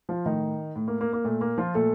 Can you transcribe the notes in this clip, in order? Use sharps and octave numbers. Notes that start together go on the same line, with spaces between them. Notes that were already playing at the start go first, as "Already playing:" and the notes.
F3 F4
A2 D#3 D#4
A2
A#3
A#3
A#3
A#2 A3
A#3
F3 F4
A#2 A3 A4